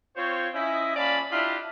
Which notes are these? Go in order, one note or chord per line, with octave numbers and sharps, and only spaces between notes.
C4 F4 C5 C#5
C#4 E4 D#5
A#2 C#4 D5 F5 A5 B5
D4 E4 F4 G4 D#5 E5